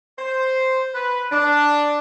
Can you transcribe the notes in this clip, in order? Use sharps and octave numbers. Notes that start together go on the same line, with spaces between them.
C5
B4
D4